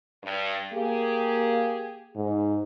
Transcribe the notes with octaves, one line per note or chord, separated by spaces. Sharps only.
G2
A#3 G4 G#4
G#2